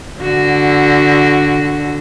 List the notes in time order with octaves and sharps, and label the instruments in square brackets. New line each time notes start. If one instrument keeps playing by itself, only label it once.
[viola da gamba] D3 F#4